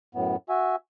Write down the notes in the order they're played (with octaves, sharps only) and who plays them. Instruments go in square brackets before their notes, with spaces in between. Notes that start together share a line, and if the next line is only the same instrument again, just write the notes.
[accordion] F#2 A2 B3
F#4 E5 G#5